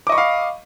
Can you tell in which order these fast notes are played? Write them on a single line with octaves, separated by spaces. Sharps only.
D6 D#5 C#6 B5 F5